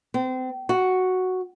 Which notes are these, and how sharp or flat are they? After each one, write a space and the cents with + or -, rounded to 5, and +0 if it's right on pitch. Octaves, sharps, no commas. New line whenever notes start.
C4 -30
F#4 +0